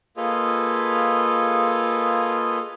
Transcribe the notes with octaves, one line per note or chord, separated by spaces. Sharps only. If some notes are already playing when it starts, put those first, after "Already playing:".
A#3 F4 G#4 A4 B4 D#5